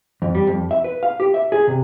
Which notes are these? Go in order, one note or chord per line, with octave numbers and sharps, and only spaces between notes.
F2
G3
F2
E5
B4
F5
G4
E5
G#4
C3